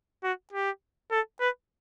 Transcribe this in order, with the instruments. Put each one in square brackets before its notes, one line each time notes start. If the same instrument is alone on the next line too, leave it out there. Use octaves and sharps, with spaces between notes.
[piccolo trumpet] F#4
G4
A4
B4